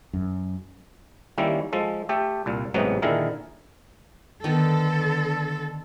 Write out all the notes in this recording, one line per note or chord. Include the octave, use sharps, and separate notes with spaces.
F#2
D#3 G3 A#3 C#4 E4
F3 G#3 A4
A3 G4 A4
C2 A#2
A1 G#2 C3 F#3 B3 D#4
A#2 D3 D#3 E4 G#4 A#4
D3 D#3 B3 A4